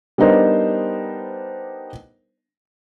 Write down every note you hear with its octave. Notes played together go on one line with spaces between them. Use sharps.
G3 B3 D4 D#4 A#4 C5